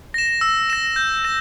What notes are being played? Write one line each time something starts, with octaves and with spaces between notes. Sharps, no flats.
A#6 E7
E6
A#6 E7
G6
A#6 E7